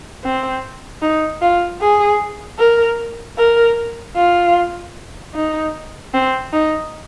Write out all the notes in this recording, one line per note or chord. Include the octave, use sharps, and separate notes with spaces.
C4
D#4
F4
G#4
A#4
A#4
F4
D#4
C4
D#4